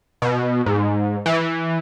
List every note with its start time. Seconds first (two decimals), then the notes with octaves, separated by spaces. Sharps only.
0.22 B2
0.66 G#2
1.26 E3